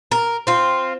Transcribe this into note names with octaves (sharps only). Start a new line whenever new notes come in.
A#4
C4 F4